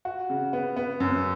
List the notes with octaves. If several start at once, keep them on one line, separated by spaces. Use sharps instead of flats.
F#4
C#3
B3
B3
F#2